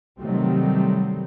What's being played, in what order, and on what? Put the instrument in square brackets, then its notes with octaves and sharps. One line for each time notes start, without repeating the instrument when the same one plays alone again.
[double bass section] C3 D#3 F#3 G3 A3 C4